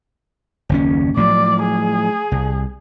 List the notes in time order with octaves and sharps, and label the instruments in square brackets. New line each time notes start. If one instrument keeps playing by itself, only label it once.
[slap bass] F#1 D#2 C#4
[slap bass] A2 F3 F#3 [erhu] D5
[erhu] G#4
[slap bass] C2